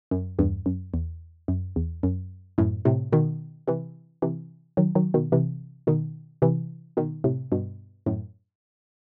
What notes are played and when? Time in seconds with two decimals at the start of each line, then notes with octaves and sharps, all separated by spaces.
0.11 F#2
0.39 E2 G2
0.66 F#2
0.94 E2
1.48 F#2
1.76 E2
2.03 F#2
2.58 F#2 A2
2.85 A2 C3
3.12 B2 D#3
3.68 C3 E3
4.22 C3 E3
4.77 D#3 F#3
4.95 D#3 F#3
5.14 B2 D#3
5.32 C3 E3
5.87 B2 D#3
6.42 C3 E3
6.97 B2 D#3
7.24 A2 C3
7.52 G2 B2
8.06 F#2 A2